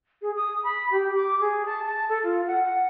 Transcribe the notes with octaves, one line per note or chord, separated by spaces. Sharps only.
G#4
D#6
B5
G4
D6
G#4
A5
A5
A4
F4
F#5
F#5